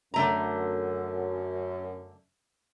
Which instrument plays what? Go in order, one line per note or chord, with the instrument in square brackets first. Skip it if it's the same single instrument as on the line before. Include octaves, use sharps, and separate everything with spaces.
[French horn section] F#2 [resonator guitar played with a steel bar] D3 A3 A#5